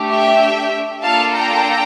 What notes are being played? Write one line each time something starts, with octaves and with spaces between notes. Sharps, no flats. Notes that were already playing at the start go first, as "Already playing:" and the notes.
Already playing: A3 D4 G4
E5 G5
A#3 D4 F4 A4 F5 A5
G5 A#5